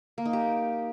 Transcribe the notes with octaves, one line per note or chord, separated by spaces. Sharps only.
A#3
D#4
G4